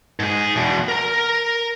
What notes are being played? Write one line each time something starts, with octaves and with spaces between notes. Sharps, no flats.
G#2 G#4
E2 B2
A#4 A#5